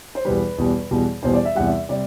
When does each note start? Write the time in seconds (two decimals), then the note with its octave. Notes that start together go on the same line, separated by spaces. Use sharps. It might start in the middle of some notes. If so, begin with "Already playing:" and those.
0.15 C5
0.25 E2 B2 G3 B4
0.58 E2 B2 G3
0.91 E2 B2 G3
1.23 E2 B2 G3 C5
1.34 D5
1.45 E5
1.55 E2 C3 G3 F#5
1.67 E5
1.89 C3 G3 D5